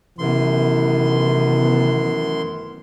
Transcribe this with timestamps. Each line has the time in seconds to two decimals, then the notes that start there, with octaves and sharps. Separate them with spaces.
0.19 F#2 C3 D#3 E3 A3 B3 C6